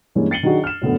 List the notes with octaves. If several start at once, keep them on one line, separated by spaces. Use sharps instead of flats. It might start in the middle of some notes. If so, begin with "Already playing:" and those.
G2 E3 G#3 A#3 C#4
A6 C7 C#7 D#7 F#7 G7
D#3 F#3 D4 F#4 G#4
F6 E7
F#2 A2 D3 A3 B3